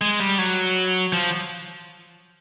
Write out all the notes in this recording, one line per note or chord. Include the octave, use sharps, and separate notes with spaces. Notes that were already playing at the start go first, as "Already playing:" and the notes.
G#3
G3
F#3
F3